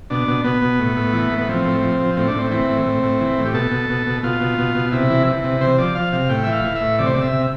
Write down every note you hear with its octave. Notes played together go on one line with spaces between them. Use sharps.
B2 D4
B2
B2 B3
B2
A2
A2
E3
A2
B3
F3 C4
A2
F3
F3
A2 C4
D4
A2 C4
E3 C4
A2
A2
A2
E3
A2
G4
B2 A4
B2
B2
B2
B2 F4
B2
B2
B2
C3 E4
E3
E3
C3
C3 C5
F3 D5
F3 F5
C3 F5
A2 G5
E3 E5
F5
E3
E5
A2
C3 D5
C5
C3 D5
E5
C3